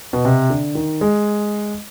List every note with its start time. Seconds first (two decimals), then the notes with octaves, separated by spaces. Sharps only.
0.13 B2
0.25 C3
0.50 D3
0.75 D#3
1.01 G#3